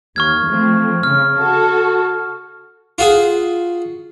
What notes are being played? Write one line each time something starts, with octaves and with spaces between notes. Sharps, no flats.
D#2 C#6 F6 G#6
F3 A3 C4
C#3 F6
F#4 A4
F4 F#4 G#4